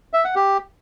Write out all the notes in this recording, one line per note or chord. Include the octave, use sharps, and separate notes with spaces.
E5
F#5
G4